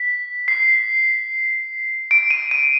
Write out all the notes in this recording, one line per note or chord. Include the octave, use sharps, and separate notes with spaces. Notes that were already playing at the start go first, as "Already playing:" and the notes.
Already playing: B6
C7
D7
D#7
D#7